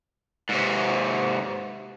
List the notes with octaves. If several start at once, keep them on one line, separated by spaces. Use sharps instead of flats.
G#2 C3